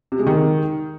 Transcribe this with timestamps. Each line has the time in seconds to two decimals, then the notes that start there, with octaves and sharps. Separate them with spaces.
0.12 C3
0.19 G#3
0.27 D#3